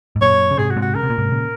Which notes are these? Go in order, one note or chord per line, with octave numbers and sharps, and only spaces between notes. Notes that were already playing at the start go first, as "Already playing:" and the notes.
G#2
F#2 A#2 C#5
C#3
G#2 C3 G#4
F#4
G#2 C3
F#4
C#3 A#4
C3
A#2
G#2 C3
A#2 C#3